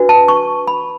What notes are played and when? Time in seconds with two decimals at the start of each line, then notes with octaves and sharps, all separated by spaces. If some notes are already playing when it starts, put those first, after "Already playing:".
Already playing: D4 F#4 B4
0.09 A5
0.28 C#6
0.67 B5